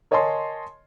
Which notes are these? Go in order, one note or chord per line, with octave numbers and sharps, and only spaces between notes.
A#4 C#5 D#5 G#5 A5 C6